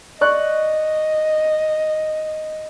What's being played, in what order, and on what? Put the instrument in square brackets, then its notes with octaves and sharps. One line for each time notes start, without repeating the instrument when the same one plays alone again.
[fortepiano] D5 C#6 F#6 [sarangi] D#5